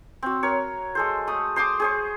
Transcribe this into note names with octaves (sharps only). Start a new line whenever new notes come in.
C4 F#4
A#4 C#5
G#3 A4 C5
A3 D#6
C5 C6 D6 D#6
G#4 C5 C#6